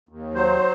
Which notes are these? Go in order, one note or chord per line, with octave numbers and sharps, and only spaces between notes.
D#2
F#3 C5